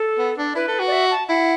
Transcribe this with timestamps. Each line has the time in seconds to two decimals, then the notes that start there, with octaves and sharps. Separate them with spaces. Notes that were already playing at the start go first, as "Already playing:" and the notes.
Already playing: A4
0.19 B3
0.38 D4
0.55 E4 B4
0.68 A4
0.80 F#4
0.87 D5
0.92 E5
1.11 A5
1.29 E4 F#5